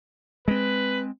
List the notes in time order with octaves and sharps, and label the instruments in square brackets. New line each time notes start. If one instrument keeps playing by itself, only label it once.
[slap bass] G#3 C4 [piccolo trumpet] B4